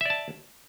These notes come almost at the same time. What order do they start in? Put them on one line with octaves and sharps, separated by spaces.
E5 D5 A5